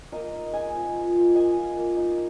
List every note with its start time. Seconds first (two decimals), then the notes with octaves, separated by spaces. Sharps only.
0.12 A#3 A#4 D#5
0.33 D#4
0.53 G#3 D#5 G#5
0.74 C4 F4
0.94 F3
1.15 A#3 F4
1.35 A#3 D#5 G#5
1.56 F4
1.77 A#3
1.97 D#4